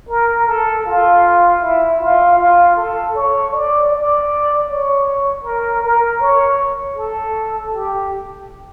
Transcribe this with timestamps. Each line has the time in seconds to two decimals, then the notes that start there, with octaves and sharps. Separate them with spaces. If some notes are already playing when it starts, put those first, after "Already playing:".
0.09 A#4
0.47 A4
0.85 F4
1.62 E4
2.00 F4
2.38 F4
2.76 A4
3.15 C#5
3.53 D5
3.91 D5
4.67 C#5
5.44 A#4
5.83 A#4
6.21 C#5
6.97 A4
7.74 G4